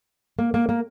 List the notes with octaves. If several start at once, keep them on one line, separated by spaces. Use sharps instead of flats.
A#3
A#3
A#3